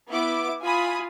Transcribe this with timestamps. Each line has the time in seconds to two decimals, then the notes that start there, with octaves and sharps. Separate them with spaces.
0.10 B3 E4 D6
0.62 F4 G#5 B5 D#6